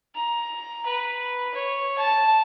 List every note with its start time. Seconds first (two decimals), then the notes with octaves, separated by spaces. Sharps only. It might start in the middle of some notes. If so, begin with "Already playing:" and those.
0.15 A#5
0.86 B4
1.54 C#5
1.98 A5